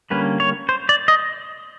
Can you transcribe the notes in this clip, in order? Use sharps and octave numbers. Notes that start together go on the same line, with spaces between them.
D3 G3 A#3 C#4 B4
C#5
C5
D5
D#5